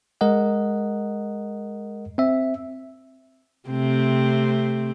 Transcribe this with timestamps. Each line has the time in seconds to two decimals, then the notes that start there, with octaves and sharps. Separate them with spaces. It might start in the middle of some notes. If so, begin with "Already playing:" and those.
0.21 G#3 A#4 D#5 F#5
2.18 C4 E5
3.69 C3 A3 C4